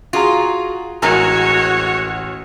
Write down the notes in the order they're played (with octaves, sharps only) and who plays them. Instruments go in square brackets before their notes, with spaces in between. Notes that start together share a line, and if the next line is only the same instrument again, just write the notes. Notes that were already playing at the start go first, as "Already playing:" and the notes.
[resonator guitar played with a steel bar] F4 [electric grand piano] F#4 G#4 A#5
[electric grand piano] A1 [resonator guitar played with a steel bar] G#3 A#4 G#5 [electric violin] F#4 C#5